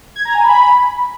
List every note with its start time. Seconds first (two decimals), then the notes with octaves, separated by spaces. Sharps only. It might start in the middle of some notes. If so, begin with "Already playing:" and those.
0.16 G#6
0.25 A#5
0.35 G#5
0.44 B5